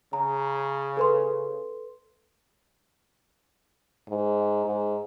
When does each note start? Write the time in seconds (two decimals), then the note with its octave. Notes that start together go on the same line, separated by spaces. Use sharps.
0.13 C#3 A#5
0.97 A4 B4 C6
4.09 G#2
4.65 G#2